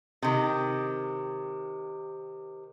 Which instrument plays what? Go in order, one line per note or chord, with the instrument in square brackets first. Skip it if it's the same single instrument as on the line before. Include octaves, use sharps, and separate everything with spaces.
[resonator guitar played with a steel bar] C3 D#3